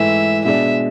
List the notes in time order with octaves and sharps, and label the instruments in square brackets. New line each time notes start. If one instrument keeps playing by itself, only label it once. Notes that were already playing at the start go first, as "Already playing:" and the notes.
Already playing: [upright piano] G#2 E3 A3 [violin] E5
[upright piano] B2 G#3 D4 [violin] E5